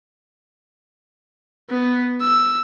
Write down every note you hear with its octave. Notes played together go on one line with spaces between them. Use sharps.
B3
E6